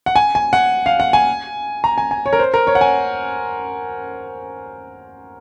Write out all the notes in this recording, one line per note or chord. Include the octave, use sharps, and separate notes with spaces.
F#5
G#5
G#5
F#5
F5
F#5
G#5
A#5
G#5
G#5
C#5
A#4
C5
A#4
C#5
F#5
G#5